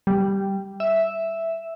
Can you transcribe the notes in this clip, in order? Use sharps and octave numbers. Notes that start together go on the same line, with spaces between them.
G3
E5